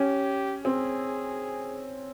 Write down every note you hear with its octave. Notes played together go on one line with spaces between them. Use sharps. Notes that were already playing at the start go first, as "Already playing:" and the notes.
Already playing: C#4 G4
C4 G#4